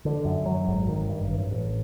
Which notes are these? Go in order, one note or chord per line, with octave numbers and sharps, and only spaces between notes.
D3
F#2
F#3
G#1
D#3
G2
A1
A1